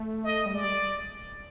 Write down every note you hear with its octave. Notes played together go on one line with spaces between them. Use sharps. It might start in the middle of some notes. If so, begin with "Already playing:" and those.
Already playing: A3
D#5
G3
G#3 D5
G3